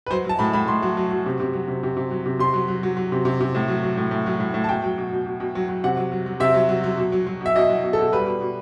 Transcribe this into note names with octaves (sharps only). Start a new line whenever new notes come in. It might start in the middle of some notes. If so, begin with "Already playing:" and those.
B4
F#3 C5
F#3 A5
A2 B5
A2 B5
A2 C6
F#3
F#3
F#3
C3
C3
F#3
C3
C3
C3
F#3
C3
C3 C6
F#3
F#3
F#3
F#3
C3
C3
C3
A2
F#3
F#3
A2
A2
F#3
A2
A2
A5
B2 G5
F#3
B2
B2
B2
B2
F#3
F#3
C3 F#5
F#3
F#3
F#3
C3 E5
F#3
F#3
F#3
B2
F#3
F#3
B2 E5
B2 D#5
F#3
B2
A4
B2
G3 B4
B2
B2